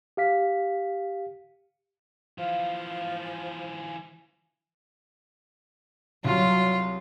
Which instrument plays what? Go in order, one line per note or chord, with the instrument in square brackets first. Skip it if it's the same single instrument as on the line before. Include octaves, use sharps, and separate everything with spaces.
[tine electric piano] G4 F5 B6
[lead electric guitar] E3 F4 [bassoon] F3 [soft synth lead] F5
[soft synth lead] G#5
[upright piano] C2 [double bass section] F#3 [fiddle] F4